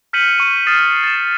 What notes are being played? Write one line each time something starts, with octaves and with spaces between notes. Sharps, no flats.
F6 G6 B6 C#7 D#7 F#7
C#6 D#7
D#6 F6 A6 C7 D#7 E7
A6 E7